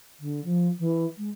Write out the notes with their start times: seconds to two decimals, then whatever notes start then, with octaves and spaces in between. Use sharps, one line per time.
0.20 D3
0.44 F3
0.79 E3
1.17 G#3